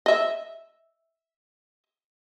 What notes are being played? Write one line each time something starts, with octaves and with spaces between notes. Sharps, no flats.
D#5 E5